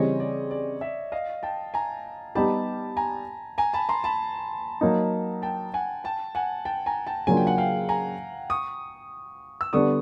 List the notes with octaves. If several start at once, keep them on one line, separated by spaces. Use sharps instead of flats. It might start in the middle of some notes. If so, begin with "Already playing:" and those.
Already playing: C#3 E3 G3 C4 C#5 D#5
D5
D5
D5 E5
D#5 F5
G5 A5
G#5 A#5
G3 B3 D#4 G4 A5 B5
G#5 A#5
G#5 A#5
A5 B5
A#5 C6
A5 B5
F#3 A#3 D#4
G5 A5
F#5 G#5
G5 A5
F#5 G#5
G5 A5
G#5 A#5
G5 A5
C#3 F#3 A#3 D4 F4 G#5
G5
F#5 G#5
F5 G5
G#5 A#5
C#6 D#6
E6
D3 G3 B3 D4 C#6 D#6